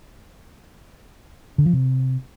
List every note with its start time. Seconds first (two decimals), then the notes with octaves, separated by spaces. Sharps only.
1.58 D3
1.66 F3
1.73 C3